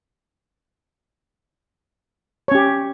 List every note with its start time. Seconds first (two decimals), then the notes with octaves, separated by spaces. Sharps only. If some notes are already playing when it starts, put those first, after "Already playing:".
2.48 C#5
2.52 C#4
2.55 G4